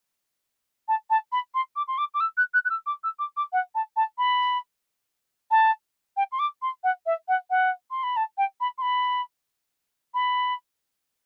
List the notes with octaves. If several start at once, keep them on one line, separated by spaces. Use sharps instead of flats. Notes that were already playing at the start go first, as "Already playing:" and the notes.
A5
A5
B5
C6
D6
C6
D6
D6
E6
F#6
F#6
F#6
E6
D6
E6
D6
D6
F#5
A5
A5
B5
A5
G5
C6
D6
C6
F#5
E5
F#5
F#5
C6
B5
A5
G5
B5
C6
B5
B5